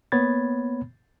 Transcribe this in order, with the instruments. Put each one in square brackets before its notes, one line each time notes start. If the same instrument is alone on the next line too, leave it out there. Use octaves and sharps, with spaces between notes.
[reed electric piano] A#3 B3 C#5 B5 G#6 A6